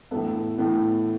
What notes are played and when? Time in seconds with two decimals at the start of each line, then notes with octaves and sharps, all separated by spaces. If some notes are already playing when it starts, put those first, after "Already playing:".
0.11 A2 E3 B3 A4
0.58 A2 E3 B3